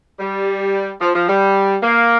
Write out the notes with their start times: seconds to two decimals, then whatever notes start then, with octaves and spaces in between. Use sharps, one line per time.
0.19 G3
1.01 F3
1.15 F3
1.29 G3
1.83 A#3